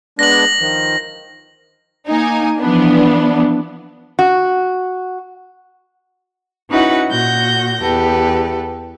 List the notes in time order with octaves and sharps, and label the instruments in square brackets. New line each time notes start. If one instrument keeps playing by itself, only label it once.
[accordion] G#3 B3 D4 [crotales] A#6 F#7
[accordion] D#3 F3
[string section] A#3 D#4 G#5
E3 F3 B3 D4
[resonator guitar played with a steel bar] F#4
[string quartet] C#4 D#4 E4 F#4 B4 F#5
A#2 F#4 G6 A#6
E2 G4 A4 B4